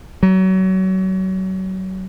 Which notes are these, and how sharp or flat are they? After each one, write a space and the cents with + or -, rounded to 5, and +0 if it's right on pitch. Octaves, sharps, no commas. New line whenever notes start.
F#3 +30